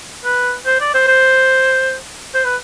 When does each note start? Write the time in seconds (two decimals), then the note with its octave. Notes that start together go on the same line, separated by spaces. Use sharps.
0.24 B4
0.66 C5
0.80 D5
0.94 C5
1.08 C5
2.34 C5
2.45 B4